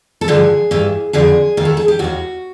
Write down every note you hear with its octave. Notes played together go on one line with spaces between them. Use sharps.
A4
G2 D3 F3 G#4
G2 E3
F2 D3 F3 G#4
D#2 D#3
A4
G#4
G4
D#2 D#3 F#4